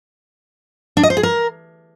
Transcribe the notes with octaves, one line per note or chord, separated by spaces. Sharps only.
D4
D#5
C5
G#4
A#4